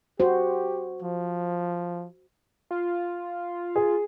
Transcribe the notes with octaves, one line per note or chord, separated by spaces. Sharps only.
F#4 G4 C5
F3
F4
G#4